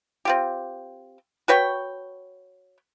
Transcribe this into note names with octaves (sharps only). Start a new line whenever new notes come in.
C4 F4 G4
F#4 B4 C#5 G5